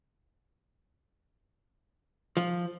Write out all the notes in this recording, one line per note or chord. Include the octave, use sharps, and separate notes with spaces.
F3